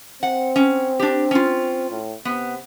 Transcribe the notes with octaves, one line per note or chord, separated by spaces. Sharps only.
C4 F#5
C#4
D4 G4
C#4 F4
A2
C3 B3